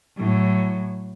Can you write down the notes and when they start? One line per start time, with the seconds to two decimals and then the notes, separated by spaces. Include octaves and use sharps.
0.17 A2 F#3